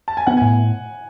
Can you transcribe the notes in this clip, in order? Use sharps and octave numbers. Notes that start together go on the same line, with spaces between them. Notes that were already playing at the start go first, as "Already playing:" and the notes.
A5
G#5
B3 F#5
G#5
A2